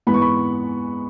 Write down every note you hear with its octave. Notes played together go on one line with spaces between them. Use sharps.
G#2 E3 B3 B5
C#6
B5